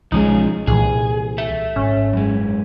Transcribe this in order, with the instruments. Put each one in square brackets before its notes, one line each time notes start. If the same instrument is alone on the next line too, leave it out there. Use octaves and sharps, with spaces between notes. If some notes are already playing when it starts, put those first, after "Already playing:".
[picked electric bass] B1 E3 G#3 [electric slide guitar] F3 C#4 G#4 [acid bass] D#4
[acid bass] C2 [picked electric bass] A#2 E3 [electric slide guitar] G#4
[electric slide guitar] A4 E5
[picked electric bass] G#1 [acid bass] C#4
[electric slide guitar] F#2 G#3